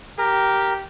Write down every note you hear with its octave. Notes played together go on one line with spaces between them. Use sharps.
G4 A#4